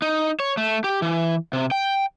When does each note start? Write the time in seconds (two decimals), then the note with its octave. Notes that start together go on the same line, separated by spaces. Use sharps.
0.02 D#4
0.40 C#5
0.57 A3
0.84 G4
1.02 E3
1.53 C3
1.71 G5